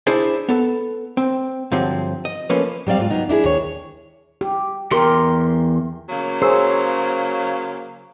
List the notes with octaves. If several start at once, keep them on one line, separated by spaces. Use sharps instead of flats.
D4 E4 G#4 C5 D5
B3 A4
C4
G2 D3 F3 F#3 C4
D#5
F3 A3 A#3 C#4 B4
F#3 G3 C4 D5 F5
G#2 F4
F#3 B3 D#4
D4 E4 G4 G#4
D#2 C#5
G4
E2 G4 A#4 C6
C#3 F#3 A#3
G#4 C5 C#5 E6